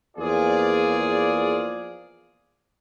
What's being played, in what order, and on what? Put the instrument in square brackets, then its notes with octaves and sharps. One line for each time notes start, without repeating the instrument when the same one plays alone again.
[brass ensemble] E2 F3 A#3 F4 G#4 D5